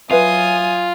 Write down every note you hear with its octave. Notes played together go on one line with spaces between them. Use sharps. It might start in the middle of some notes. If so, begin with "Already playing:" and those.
F#3 F4 B4 E5 G#5 D#6